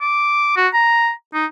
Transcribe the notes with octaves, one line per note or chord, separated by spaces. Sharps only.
D6
F#4
A#5
D#4